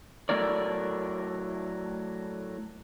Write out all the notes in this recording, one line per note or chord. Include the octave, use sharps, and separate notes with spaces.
F#3 A3 E4 A#4 D5